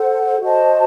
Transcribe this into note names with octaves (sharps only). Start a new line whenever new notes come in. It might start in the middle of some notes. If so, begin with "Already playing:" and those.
Already playing: A4 C5 F#5
F#4 C5 D#5 A5